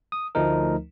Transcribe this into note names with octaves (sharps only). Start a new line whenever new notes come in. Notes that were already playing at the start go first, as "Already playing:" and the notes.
D#6
D2 F3 A3 D#4 A#4